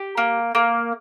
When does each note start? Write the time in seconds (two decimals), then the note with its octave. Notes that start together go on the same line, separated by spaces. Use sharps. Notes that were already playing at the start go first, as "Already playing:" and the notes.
Already playing: G4
0.17 A#3
0.55 A#3